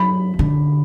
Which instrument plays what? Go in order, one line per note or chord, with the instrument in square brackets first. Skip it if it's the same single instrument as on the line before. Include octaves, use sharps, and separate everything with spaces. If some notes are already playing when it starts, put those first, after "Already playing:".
Already playing: [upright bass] F#3 [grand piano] B5
[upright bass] D3